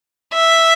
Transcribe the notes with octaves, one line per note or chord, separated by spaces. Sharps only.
E5